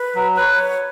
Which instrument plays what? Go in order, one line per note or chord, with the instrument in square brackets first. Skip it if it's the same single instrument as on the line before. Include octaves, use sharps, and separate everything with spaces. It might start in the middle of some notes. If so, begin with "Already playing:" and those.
Already playing: [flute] B4
[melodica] F#3
[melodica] B4 [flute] C#5